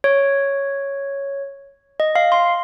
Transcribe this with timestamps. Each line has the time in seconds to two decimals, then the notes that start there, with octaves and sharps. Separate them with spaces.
0.04 C#5
2.00 D#5
2.16 F5
2.32 C6